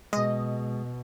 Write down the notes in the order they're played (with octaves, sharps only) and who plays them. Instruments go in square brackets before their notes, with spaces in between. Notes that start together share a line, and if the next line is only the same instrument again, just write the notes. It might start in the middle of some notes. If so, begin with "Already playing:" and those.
[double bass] B2 [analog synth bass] G#3 [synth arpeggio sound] D#5